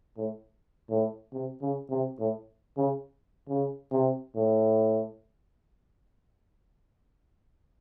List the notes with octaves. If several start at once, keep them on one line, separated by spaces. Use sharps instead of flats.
A2
A2
C3
C#3
C3
A2
C#3
C#3
C3
A2